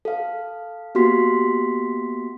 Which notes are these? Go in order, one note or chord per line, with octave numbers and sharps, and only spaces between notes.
A4 F5
A#3 B3 F#4 G4 C6 B6